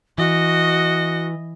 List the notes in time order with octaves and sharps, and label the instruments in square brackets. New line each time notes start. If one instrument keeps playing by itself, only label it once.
[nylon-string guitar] E3 [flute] F#4 [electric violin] D#5